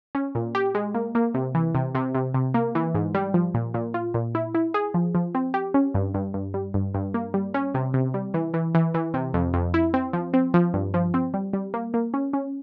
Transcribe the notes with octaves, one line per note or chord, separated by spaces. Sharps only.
C#4
A#2
G4
G#3
A#3
A#3
C3
E3
C3
C3
C3
C3
A#3
E3
G#2
G3
F3
A#2
A#2
F4
A#2
E4
E4
G#4
F3
F3
C4
G4
C#4
G2
G2
G2
G3
G2
G2
A#3
G3
C#4
C3
C3
G3
E3
E3
E3
E3
C3
F2
F2
E4
C4
F3
C4
F3
G2
F3
C4
G3
G3
A#3
A#3
C#4
C#4